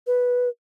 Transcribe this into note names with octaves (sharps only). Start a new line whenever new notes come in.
B4